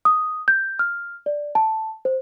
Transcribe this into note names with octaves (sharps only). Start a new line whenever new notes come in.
D#6
G6
F6
D5
A5
C5